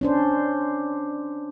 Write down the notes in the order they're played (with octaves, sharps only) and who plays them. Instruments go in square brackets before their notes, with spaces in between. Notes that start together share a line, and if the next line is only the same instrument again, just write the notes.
[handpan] C#4 D4 C5